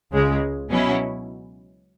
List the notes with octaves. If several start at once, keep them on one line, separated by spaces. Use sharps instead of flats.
C#2 C#3 G#3
B2 F#3 C#4 E4